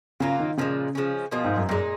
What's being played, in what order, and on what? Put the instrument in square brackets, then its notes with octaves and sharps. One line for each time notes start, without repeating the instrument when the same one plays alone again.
[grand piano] C#3 [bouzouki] F#3 A#3 F4
[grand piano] D#3
[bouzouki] A#2 F3 G#3 [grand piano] C#3
[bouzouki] F3 G#3 C#4
[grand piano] B2 [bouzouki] F3 A#3 F4 G#4
[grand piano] G#2
F#2
[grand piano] F#2 [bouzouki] A#2 G#3 D#4